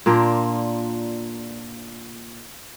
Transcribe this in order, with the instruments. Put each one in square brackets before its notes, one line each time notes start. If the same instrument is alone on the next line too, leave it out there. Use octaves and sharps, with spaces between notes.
[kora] A#2 A#3 D4 F4